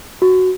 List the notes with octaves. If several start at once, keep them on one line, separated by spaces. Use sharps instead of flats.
F#4